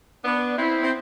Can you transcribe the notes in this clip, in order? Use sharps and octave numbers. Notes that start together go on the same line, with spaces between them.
B3 D4
C4 E4
C4